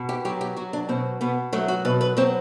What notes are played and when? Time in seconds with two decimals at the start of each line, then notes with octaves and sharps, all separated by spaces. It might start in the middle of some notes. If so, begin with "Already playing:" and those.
Already playing: B2
0.09 G4
0.25 F#3 G4
0.41 G4
0.57 F#3 F#4
0.73 D4
0.89 B2 C4
1.21 B2 B3
1.53 F#3 A3
1.68 F#4
1.85 B2 B4
2.01 B4
2.17 F#3 C4